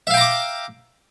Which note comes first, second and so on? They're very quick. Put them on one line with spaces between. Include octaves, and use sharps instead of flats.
E5 F5 G5 A#5 D6